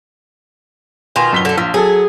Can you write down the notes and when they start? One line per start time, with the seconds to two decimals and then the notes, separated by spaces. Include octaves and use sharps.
1.16 B2 D#3 F4 G#5
1.33 F#2 B6 G7
1.45 D3 A3
1.58 A#1 F3
1.74 F#3 G#4 A4